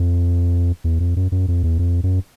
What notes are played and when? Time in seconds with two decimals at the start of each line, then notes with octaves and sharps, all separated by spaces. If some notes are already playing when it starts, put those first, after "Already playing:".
Already playing: F2
0.84 E2
1.00 F2
1.16 F#2
1.32 F#2
1.48 F2
1.63 E2
1.79 F2
2.03 F#2